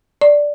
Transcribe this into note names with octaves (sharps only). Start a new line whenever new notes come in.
D5